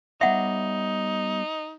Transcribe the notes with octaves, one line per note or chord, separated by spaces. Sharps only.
G3 B3 D#4 C#5 E5 F#5